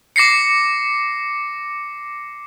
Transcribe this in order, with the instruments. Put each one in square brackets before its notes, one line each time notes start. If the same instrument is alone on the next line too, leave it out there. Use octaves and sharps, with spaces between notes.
[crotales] D6 A#6 C7 C#7